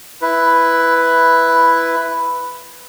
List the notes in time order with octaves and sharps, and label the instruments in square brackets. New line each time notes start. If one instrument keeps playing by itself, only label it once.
[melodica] E4 B4